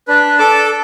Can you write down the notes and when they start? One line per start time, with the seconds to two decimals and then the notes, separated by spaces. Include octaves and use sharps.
0.08 D4 B4
0.39 A4 A5 D6